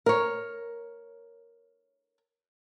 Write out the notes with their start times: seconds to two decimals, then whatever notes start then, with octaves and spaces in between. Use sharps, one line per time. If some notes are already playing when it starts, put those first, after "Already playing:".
0.06 A#4 C#5